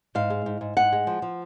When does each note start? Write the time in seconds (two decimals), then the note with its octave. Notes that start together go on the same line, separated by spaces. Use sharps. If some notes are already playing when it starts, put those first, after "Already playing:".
0.15 G#2 F5
0.30 G#3
0.46 G#2
0.61 G#2
0.77 G#2 F#5
0.92 G#3
1.07 F3
1.22 F3